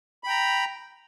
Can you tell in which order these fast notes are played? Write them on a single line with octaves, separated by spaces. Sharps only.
B5 G5 A#5